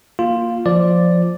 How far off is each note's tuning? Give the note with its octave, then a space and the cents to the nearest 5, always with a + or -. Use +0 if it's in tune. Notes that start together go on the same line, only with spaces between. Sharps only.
A#3 +0 F4 +0
F3 +0 D5 +0